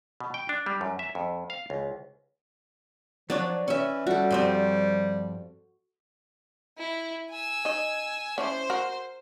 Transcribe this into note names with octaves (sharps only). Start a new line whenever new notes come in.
B2
G5
D4
G3
F#2
E5
F2
F5
C#2
F3 F#3 D4 C#5 D5
E3 C#4 E5
G3 F#4 A4
G2 F3 C4
E4
G#5 E6
D#4 D#5
C#4 D4 E4 C5
F#4 A#4